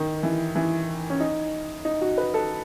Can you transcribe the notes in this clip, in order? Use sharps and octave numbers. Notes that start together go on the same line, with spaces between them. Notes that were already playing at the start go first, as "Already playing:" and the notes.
Already playing: D#3
E3
E3
C#4
D#4
D#4
F#4
B4
A4